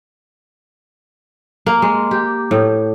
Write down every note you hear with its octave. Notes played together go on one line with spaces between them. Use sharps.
A#3
G#3
G4
A2